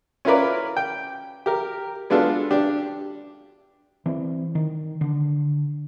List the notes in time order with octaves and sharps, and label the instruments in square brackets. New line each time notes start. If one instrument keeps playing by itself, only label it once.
[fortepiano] C#4 E4 F4 A#4 B4 D5
G5
G4 A#4
G#3 B3 D4 F4 A4
D4 G4
[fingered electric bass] E3 C4
D#3
D3